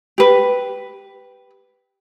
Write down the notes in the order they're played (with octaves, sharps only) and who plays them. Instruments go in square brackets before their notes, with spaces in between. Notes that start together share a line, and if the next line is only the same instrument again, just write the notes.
[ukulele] G4 B4